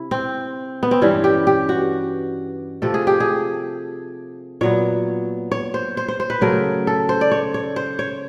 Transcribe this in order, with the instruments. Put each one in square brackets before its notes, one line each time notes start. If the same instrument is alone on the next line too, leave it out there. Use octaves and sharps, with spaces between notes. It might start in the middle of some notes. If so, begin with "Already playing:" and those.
Already playing: [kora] C3 E4
C4
B3
C4
G2 E3 G3 C#4
G4
G4
F#4
C3 F3 A3 A4
G#4
G4
G#4
A#2 F#3 B3 C#5
C#5
C5
C5
C5
C5
B4
C#3 F#3 A3 A#4
A4
C5
D5
C#5
C#5
C5
C#5